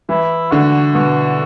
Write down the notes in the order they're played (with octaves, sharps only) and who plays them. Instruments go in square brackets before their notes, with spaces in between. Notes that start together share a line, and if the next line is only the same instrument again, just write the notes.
[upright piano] E3 [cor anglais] E4
[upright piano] D3 [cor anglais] F#4
[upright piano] B2 [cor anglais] F#4